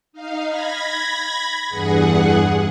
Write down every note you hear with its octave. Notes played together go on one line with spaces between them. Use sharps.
D#4 F5
B5 G#6 A#6
E2 G2 G#4 F#5